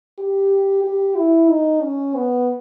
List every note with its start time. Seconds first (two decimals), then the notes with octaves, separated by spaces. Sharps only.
0.18 G4
0.84 G4
1.16 E4
1.49 D#4
1.81 C#4
2.15 B3